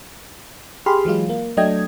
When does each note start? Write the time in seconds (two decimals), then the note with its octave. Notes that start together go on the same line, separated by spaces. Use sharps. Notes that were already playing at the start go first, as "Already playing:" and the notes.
0.86 G4 G#4 B5 C6 F6
1.05 E3 F#3 G#3 F4
1.29 A#3
1.57 F#3 A3 D4 D#5 G5 G#6